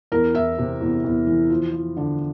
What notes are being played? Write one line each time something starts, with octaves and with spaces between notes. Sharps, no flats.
E2 A#4
E2 E5
C3
E2
E2
E3
F3
F3
D3